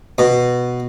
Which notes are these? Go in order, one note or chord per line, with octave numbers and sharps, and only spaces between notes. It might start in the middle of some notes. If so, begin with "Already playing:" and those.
B2